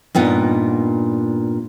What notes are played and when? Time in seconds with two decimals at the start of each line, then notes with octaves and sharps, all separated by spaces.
0.15 G2 A#2 B3 D#4